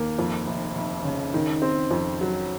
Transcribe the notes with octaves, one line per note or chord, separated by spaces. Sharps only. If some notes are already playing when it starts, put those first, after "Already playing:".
Already playing: D#2 A#3
F2
F1
F1
C#3
D#3
C4
F2
F#3